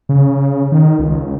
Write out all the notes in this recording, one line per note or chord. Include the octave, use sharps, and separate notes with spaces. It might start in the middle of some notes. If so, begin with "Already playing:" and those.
C#3
D#3
C#2